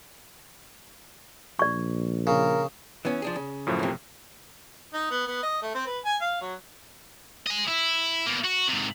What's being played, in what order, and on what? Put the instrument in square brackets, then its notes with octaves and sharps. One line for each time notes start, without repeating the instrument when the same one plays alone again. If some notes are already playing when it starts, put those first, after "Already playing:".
[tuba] A#1 [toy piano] D5 C#6
[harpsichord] C#3 [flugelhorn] A#4
[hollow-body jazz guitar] E3 B3 C#4
F3 D4 G#4
C#3
[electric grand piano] F#2 A2 F3
[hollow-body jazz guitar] C3 A#3
[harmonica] D#4
B3
B3
D#5
A3
C4
B4
G#5
F5
F#3
[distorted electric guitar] D#5 G#5
E4
B2 A#3
F#4
G#2 C3